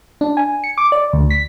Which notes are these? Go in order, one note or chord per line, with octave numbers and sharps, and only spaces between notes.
D4
G#5
C#7
D6
D5
D2
B6